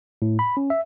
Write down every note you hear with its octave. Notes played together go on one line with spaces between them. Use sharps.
A2
B5
C#4
E5